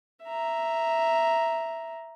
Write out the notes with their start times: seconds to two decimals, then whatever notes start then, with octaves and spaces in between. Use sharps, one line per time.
0.24 E5 A#5